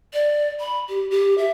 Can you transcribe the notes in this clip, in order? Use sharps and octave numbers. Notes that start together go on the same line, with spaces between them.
D5
B5
G4
G4
E5